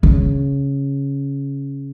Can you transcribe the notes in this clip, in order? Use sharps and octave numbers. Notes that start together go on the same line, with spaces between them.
C#3